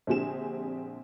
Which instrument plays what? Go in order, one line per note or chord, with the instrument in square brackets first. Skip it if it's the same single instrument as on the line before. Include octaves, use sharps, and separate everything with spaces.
[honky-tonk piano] A#1 D3 C4 G4 G#4 E7